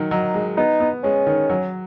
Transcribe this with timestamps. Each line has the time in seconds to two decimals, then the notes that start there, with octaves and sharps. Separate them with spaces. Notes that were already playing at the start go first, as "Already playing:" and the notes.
Already playing: D#3 F#3
0.11 F#3 D#4
0.34 G#3
0.57 B3 D#4
0.80 B3
1.03 G#3 C#4
1.27 D#3
1.50 F#3